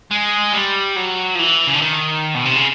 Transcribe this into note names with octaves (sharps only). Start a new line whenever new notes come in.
G#3
G3
F#3
F3
E3
C#3
D3
D#3
B2
C3
C#3